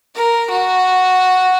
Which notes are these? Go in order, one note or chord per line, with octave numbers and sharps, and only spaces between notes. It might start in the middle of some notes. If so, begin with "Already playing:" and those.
A#4
F#4